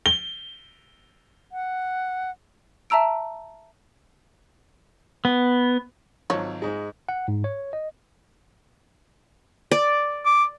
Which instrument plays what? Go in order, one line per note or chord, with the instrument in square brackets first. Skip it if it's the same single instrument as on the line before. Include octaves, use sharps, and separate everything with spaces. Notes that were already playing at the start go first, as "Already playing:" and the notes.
[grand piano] G7
[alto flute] F#5
[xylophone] E5 A5 A#5 E6 D7
[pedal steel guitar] B3
[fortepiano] G#1 F#3 [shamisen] F3 C#5
[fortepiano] G#2 G#3
[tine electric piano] F#5
G#2
C#5
D#5
[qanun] D5
[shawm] D6